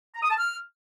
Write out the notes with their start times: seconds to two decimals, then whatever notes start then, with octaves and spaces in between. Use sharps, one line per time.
0.15 A#5
0.23 D#6
0.31 A5
0.39 F6